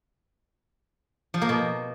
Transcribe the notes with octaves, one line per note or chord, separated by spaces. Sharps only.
F3
A#3
B2